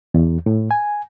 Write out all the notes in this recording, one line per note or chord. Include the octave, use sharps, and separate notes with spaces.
E2
A2
G#5